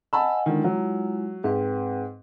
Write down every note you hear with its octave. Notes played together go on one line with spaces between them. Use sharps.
D#5 F#5 G#5 A5 B5 E6
D3 D#3 G#3 E4 F4
F#3
G#2 C4 B4 G5